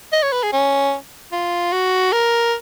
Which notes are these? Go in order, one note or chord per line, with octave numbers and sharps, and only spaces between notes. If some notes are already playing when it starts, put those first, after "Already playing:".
D#5
C#5
B4
G#4
C#4
F4
F#4
A#4